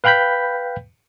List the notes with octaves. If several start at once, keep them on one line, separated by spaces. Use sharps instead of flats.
B4 F5 G5 B5 G6 B6